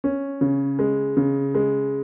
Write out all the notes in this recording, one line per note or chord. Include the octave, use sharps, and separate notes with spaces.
C#4
C#3
G#3
C#3
G#3